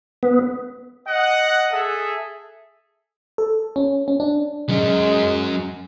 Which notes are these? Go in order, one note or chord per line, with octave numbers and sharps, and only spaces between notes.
B3
D#5 F#5
G#4 A4 E5
A4
C#4
C#4
D4
F#3 G#3 C#4